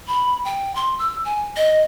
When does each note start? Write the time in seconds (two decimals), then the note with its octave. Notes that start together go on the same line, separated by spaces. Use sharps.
0.08 B5
0.45 G5
0.76 C6
0.99 E6
1.25 G#5
1.57 D#5